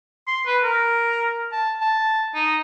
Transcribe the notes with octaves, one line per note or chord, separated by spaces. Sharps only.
C6
B4
A#4
A5
A5
D#4